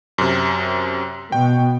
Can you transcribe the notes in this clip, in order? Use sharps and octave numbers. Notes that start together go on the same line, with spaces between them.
F#2 C3
B2 G5